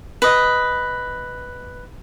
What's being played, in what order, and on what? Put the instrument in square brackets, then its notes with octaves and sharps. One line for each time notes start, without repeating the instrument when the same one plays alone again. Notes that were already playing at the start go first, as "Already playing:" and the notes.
[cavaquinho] B4 D#5